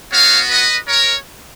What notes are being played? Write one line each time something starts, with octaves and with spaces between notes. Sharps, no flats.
B3 F#4 C#5 F5
B4 D#5
A#4 C#5